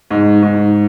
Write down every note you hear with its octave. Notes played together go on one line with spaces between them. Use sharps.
G#2
G#2